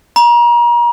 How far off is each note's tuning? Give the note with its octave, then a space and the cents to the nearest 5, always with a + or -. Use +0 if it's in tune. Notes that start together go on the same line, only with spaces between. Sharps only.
A#5 +35